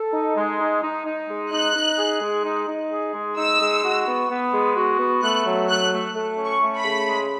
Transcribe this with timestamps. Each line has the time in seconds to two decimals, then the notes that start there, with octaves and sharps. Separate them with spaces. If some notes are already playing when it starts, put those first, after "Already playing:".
Already playing: A4
0.13 D#4
0.36 G#3
0.60 D#4
0.83 D#4
1.06 D#4
1.29 G#3
1.52 D#4 F#6
1.76 D#4
1.99 G#4
2.22 G#3
2.45 D#4
2.68 D#4
2.92 G#4
3.14 G#3
3.37 D#4 E6
3.61 G#3
3.84 F#4
4.07 B3
4.30 B3
4.53 G#3
4.76 F#4
5.00 B3
5.22 A3 F#6
5.46 F#3
5.69 A3 F#6
5.92 A3
6.15 A3
6.38 C#4
6.46 C#6
6.62 A3
6.77 B5
6.85 C#3
7.08 G#3